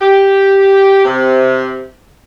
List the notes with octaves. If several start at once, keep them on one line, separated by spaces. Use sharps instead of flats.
G4
C3